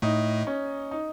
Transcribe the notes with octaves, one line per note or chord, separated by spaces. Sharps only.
A2 A3 D#4
C#4
D#4